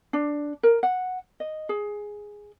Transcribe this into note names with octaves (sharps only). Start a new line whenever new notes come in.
D4
A#4
F#5
D#5
G#4